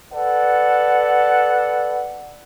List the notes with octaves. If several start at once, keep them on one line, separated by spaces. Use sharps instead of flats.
A4 B4 D5 F#5